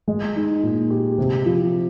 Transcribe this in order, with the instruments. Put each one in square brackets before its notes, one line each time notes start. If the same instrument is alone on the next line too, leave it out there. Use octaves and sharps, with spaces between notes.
[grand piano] G#3
D#4
A#2
G4
C3
F3